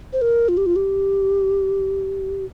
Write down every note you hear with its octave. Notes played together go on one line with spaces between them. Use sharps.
C5
A#4
F4
G4
F4
G4